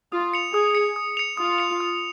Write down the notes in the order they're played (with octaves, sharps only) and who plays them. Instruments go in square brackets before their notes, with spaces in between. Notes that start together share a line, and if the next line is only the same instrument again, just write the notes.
[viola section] F4 [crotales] D#6
[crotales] C#7 F7
[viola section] G#4 [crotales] D#6
[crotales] C#7 F7
D#6
C#7 F7
[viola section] F4 [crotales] D#6
[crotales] C#7 F7
D#6